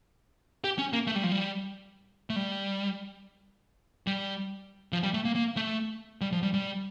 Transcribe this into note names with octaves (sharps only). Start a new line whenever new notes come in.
G4
C#4
A#3
A3
G3
F3
G3
A3
G3
G3
F3
G3
A3
A#3
A#3
A3
G3
F3
G3
G3